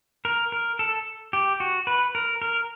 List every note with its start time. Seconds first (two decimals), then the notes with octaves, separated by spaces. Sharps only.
0.25 A#4
0.52 A#4
0.79 A4
1.33 G4
1.60 F#4
1.87 B4
2.15 A#4
2.42 A#4